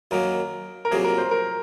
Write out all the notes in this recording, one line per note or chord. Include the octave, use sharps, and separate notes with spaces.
F#2 D#3 F#3 A#3 A#4
A#4
F2 C3 F#3 A#3 G#4
A#4
C5
A#4